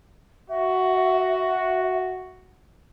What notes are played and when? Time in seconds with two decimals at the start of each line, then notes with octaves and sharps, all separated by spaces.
0.49 F#4 E5